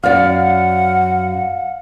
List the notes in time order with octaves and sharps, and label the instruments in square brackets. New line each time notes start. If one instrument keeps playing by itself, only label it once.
[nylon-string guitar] F#2 D5 [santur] F5 [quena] F#5